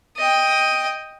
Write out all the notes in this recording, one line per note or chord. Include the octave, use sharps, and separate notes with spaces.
D#5 G5